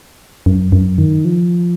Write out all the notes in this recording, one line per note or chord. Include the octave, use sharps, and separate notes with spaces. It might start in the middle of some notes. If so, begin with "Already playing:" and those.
F#2
F#2
D#3
F3